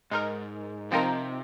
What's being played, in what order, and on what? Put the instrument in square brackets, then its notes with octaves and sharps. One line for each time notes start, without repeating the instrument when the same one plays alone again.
[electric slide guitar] G#2 [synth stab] G#3 D#4 A#4
[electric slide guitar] C3 [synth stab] F3 C4 D#4 A#4